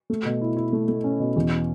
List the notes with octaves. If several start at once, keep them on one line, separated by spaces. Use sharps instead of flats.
A3
B2
E4
E4
A3
A3
C#4
B2
E2